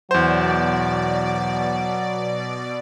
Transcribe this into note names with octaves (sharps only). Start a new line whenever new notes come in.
E2 B2 F#3 C5 D5